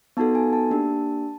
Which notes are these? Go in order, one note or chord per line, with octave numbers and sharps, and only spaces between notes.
B3 D#4 F#4 A4 A5
G#5
A5
A#3 D4 G4